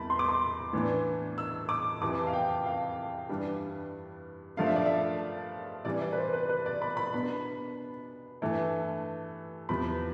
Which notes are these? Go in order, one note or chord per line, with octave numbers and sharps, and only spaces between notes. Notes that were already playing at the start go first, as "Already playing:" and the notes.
Already playing: E2 C3 E3 G3 A5 B5
C6
D6
C6
A2 E3 B3 D4
E6
D6
F2 C3 E3 D6
F5
G5
F5
G2 E3 G3 D4
G2 F3 A3 D4 F5
E5
D5
E5
C3 E3 G3 D5
D5
B4
C5
B4
B4
D5
B5
B5
B2 B3 D4 B5
G2 E3 A3
E2 C3 F3 B3 B5